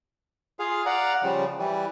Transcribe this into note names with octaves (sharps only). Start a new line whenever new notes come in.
F4 G#4 F5
D5 F5 F#5 A#5
C#3 F3 G3
E3 G3